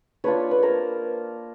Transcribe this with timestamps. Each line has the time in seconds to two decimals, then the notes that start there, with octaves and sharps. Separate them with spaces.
0.24 A#3 D4 F4 B4 C#5
0.51 B4
0.63 A#4 C5